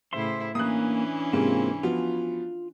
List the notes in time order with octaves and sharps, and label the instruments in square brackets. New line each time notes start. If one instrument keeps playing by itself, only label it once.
[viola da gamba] A2 C#3 E4 [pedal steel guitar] C5 E5 C6
[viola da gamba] E3 C#4 D4 [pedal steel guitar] A#3 [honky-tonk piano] D#6 F#6
[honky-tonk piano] G#2 C3 G#3 [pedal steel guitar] A#3 C4 F4
[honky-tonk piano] F3 B3 F#4 [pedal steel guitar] F4